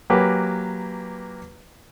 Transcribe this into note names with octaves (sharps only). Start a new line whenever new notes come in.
F#3 A#3 G4 B4 G#5